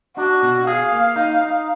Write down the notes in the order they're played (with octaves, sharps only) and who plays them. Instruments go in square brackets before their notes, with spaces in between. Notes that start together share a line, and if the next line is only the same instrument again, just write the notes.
[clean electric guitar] D4 [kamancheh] F#4
[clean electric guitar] B2
[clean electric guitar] G#4 [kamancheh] F5
[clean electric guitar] A#3
D#4
D#4